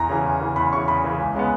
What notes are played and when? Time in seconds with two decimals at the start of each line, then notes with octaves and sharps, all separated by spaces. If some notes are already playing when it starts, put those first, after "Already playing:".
Already playing: E2 A#5
0.09 C#3 E3
0.26 E2
0.41 C#3 E3
0.56 E2 B5
0.73 C#3 E3 C#6
0.88 E2 B5
1.04 C#3 E3
1.20 C#2
1.35 C#3 G#3 B3